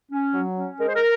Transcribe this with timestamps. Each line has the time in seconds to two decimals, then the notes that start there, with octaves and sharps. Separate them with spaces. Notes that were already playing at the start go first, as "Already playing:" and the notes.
0.11 C#4
0.34 F#3
0.56 C#4
0.79 G#3 A#4
0.87 C5
0.94 A#4